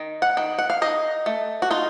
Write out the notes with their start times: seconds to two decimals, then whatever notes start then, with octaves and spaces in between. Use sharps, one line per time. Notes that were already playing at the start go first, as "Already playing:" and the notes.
Already playing: D#3
0.22 F#5
0.37 D#3
0.58 F#5
0.70 F5
0.82 D#4 D#5
1.26 A3
1.62 F#4
1.71 D#4 F4